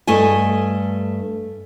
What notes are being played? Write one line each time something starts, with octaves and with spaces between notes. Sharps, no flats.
G2 A3 D#5 G#5